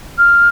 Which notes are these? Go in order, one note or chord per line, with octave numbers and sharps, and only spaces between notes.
F6